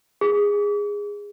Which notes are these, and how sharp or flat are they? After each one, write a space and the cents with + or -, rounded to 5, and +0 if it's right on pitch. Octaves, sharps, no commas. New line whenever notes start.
G#4 -15